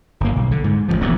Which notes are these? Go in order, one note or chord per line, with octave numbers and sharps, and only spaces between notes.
G1 A#3
B1
D3
G#2
A1 G#2 F3
D#1 A1 F2 B3